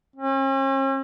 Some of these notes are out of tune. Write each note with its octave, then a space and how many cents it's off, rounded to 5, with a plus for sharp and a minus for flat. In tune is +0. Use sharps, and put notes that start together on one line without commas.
C#4 -45